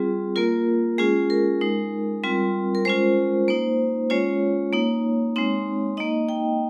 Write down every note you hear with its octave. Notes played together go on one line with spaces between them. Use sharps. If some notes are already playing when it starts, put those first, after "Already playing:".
Already playing: G3 C4 F4 G#4
A#3 F4 A#4
G#3 C#4 F4 G#4
A#4
G#3 D#4
G3 C4 F4
A#4
G#3 C#4 F4 C5
A#3 D#4 C5
G#3 C#4 F4 C#5
A#3 D#4
G#3 C4 D#4
A#3 D#4 D#5
G5